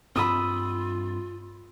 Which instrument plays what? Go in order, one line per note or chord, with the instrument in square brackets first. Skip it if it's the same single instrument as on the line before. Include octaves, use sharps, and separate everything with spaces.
[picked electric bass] G2 C4 [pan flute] F4 [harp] B5 D#6 E6